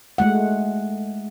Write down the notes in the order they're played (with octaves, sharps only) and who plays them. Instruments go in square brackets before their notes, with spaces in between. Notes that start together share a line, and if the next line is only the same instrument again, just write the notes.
[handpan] G#3 A3 F#5